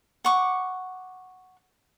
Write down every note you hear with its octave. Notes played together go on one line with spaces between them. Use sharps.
F#5 C#6 D6